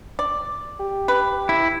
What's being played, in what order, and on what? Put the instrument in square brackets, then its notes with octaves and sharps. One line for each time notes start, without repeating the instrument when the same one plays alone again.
[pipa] D5
[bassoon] G4
[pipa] B4
[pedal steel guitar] E4